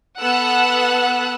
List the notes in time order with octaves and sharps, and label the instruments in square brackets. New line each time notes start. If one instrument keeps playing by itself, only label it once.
[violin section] B3 A4 F#5 E6 F#6